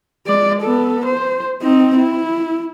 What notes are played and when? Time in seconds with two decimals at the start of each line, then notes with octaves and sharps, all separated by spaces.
0.27 G#3 D5
0.62 B3 A4
1.06 C5
1.62 C4 D#4
1.97 E4